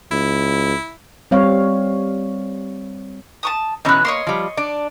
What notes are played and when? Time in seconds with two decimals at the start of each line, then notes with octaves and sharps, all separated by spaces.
0.12 C#2 E4
1.31 G3 C4 C#5 F5
3.43 A5 C#6 D#6
3.85 B2 E3 C#4 D#4 F#6
4.05 A#3 C#5 D#5 C6
4.27 F3 G3
4.57 D4 D5